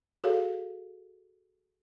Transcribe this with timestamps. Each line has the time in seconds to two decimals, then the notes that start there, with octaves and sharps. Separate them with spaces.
0.24 F#4 G#4 A4 C#5 F5